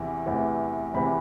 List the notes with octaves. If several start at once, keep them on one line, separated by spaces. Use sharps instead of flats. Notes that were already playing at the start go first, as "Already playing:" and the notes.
Already playing: E2 C3 E3
E2 C3 E3
E2 C3 E3 B5